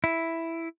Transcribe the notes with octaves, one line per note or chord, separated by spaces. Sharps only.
E4